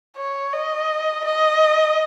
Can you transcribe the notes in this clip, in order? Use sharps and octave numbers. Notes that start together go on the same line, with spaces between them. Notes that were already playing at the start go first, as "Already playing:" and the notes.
C#5
D#5
D#5